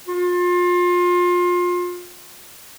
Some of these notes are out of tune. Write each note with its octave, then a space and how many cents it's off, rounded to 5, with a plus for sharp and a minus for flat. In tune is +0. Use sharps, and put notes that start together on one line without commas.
F4 +25